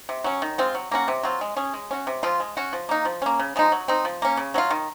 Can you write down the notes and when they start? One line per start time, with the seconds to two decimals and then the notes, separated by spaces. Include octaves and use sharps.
0.09 C3
0.24 F#3 C#4
0.42 D#3
0.58 G#3 C4 F4
0.74 F#3
0.91 A#3 C#4 F#4
1.08 C3
1.23 F#3 C4 F4
1.41 G#3
1.57 C#4 G#4
1.74 G#3
1.91 C#4 F#4
2.07 C3
2.23 F3 C4 F4
2.40 G#3
2.57 C#4 F#4
2.73 F3
2.89 A#3 D#4
3.05 F3
3.22 A#3 C#4
3.39 C#3
3.56 F3 G#3 D#4
3.72 F#3
3.88 C4 D#4
4.05 F3
4.22 A#3 C#4
4.37 C#3
4.54 F#3 C#4 F4
4.70 D#3